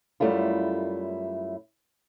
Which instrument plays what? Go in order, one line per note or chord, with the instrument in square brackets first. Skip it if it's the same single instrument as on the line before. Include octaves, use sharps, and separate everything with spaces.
[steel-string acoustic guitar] F#2 G3 A3 E4 F4